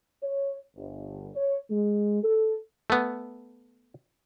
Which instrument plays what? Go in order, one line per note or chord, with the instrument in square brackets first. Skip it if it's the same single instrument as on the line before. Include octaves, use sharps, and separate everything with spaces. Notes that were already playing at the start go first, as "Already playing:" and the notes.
[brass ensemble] C#5
G1
C#5
G#3
A4
[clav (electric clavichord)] A3 B3